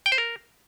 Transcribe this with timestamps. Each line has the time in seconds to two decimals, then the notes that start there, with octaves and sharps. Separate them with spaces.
0.06 G5
0.12 C5
0.18 A#4